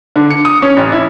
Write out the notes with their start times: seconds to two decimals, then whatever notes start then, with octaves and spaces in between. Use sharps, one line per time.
0.16 D3
0.30 C#7
0.45 D#6
0.62 C#4
0.77 A1
0.92 E4